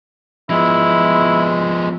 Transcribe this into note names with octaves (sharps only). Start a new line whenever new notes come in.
F3 G#3 B3 E4